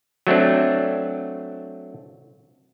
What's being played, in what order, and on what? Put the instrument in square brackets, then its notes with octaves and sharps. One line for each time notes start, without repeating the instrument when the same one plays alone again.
[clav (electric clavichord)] F#3 A3 C4 D4